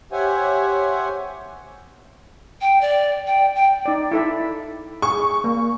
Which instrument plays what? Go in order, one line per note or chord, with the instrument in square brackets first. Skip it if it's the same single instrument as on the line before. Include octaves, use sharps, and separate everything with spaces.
[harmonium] G4 C5 C#5 E5 F#5 G#5
[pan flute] G5
D5
G5
G5
[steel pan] D#4 D5
E4 A4 E5
[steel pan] G#4 [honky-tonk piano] C#6
[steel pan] A#3